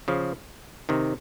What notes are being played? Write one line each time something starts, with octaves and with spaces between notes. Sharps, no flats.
C#3 F3
C3 D#3